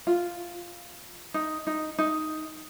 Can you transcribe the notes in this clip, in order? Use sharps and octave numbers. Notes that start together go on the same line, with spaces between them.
F4
D#4
D#4
D#4